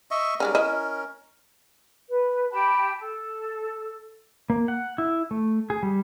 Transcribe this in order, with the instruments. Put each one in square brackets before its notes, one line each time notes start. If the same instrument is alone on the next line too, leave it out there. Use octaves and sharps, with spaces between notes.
[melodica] D#5 E5 C#6
[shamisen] G3 G#3 D#4 [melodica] C#4 A#4
[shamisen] E4 D#5
[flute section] B4
G4 G5 A5 B5
A4
[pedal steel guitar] A#3
F#5
E4
A3
G#4
G3